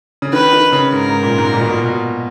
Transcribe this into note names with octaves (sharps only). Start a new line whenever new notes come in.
C#3
D#3 B4
D#3
C#3
G#2 A#4
G#2
A#2
G#2
A#2
B2
A#2
B2